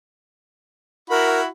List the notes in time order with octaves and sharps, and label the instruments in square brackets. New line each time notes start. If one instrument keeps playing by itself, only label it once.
[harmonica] E4 F#4 B5 [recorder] A#4